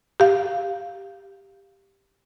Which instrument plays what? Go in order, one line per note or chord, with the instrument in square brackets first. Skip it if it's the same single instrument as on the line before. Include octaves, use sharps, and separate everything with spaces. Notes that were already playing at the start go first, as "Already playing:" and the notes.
[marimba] G4 F5